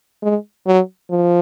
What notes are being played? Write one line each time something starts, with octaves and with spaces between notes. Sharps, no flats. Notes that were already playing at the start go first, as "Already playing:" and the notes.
G#3
F#3
F3